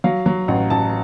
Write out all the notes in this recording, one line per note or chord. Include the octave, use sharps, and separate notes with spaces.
F#3 F5
F#3
A1 F#5
A1 A5